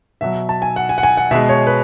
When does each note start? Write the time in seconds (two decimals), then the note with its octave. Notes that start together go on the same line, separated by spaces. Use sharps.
0.21 B2 F#3 E5
0.49 A5
0.62 G#5
0.76 F#5
0.89 G#5
0.98 F#5
1.03 G#5
1.17 F#5
1.31 B2 G#3 E5
1.49 C#5
1.67 B4